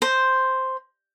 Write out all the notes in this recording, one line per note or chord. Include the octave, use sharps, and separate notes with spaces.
C5